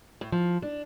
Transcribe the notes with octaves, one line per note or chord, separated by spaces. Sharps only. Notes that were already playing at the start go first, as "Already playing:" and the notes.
A2
F3
D4